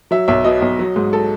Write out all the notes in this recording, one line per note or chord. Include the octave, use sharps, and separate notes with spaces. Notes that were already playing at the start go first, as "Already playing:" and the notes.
F#3 E5
B1 E5
B2 D#5
B1
F#3
G#2
A4